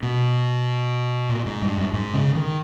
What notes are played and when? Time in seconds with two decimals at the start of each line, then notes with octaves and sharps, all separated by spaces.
0.03 B2
1.29 A#2
1.46 G#2
1.62 G2
1.77 F#2
1.93 G#2
2.14 C#3
2.35 D#3